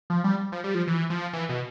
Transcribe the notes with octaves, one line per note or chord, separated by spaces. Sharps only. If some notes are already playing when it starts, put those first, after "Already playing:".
F3
G3
F3
G3
F3
E3
F3
E3
B2